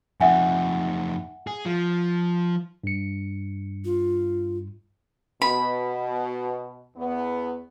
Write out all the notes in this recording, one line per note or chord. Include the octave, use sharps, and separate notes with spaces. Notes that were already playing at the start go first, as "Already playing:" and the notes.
F2 D#4 E5 F#5 G#5
G#4
F3
G2 C#7
F4
B2 B5
E2 B3